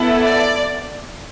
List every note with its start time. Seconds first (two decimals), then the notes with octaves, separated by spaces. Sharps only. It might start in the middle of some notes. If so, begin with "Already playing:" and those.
Already playing: B3 E4 A4
0.21 D5